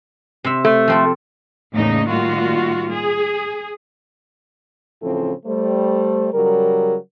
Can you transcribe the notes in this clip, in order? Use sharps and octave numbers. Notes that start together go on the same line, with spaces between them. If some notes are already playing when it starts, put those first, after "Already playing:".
C3 E5
A3
F3 C4 A4
E2 A2 C#3 A#3 D#4 D#5
A2 D#3 G3 A#3 F4 F#4
G#4
A2 C#3 E3 F3 C4 A4
G3 A3 C5
C#3 F#3 G3 A#4